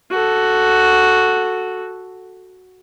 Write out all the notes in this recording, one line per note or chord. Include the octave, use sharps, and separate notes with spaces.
F#4 A4